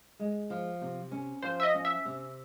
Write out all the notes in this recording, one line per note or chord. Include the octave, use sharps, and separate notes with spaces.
G#3
F3
C3
C#4
F3 C5
E5
D#5
C#4
E5
C3